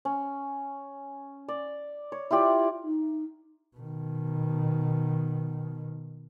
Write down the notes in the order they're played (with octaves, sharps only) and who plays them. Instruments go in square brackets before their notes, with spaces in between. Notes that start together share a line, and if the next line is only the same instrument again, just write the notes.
[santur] C#4
D5
C#5
E4 F4 G4 D5
[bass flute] D#4
[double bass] B2 D#3